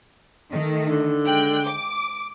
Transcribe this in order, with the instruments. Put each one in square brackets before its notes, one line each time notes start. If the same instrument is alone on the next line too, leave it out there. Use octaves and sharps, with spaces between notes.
[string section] D#3 A3
[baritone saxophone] D3
[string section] G#3 G5 F#6
D6